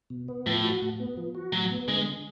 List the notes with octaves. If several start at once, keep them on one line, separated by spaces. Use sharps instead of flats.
B2
B3
A2 F3
F#4
A2
B3
F3
F#4
A2 F#3
B3
D3 G#3